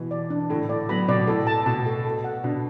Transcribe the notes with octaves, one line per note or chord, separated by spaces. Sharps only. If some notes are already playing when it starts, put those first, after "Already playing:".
Already playing: B2 E3
D5
D4
A2 D3 A4
A2 D5
F#3 B3 B5
B2 D5
A2 A4
A5
B2 A5
A4
A4
F#5
B2 D4